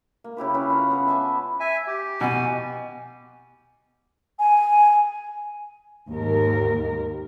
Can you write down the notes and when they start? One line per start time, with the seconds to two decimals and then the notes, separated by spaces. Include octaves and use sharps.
0.24 A#3
0.37 C#3 E4 G4 B4
0.54 C#4 E4 G#4 B4
0.70 F4 C#5 A#5
0.90 B3 G#4 B4
1.08 E5 G#5 A5 D6
1.60 E5 G#5
1.87 G4
2.21 B2 G#5
4.39 G#5
6.10 D#2 G#2 A#4